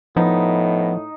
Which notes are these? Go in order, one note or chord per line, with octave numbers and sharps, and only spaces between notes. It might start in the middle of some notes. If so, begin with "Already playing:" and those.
A2 F3 B3 D#4